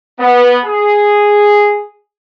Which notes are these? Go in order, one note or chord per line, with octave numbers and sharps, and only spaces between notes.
B3
G#4